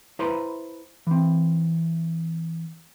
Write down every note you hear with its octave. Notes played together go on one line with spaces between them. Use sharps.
E4 B4 C5 E5 A#5 C6
E3 C4